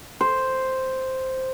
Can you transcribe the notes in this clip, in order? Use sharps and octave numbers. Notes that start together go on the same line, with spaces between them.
C5